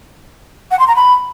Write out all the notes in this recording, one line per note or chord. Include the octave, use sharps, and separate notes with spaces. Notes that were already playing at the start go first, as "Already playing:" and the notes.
F#5
C6
A#5
B5